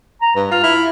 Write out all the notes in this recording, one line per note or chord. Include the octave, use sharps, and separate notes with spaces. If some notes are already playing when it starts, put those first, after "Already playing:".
A#5
G2 B4
F4 F6
E4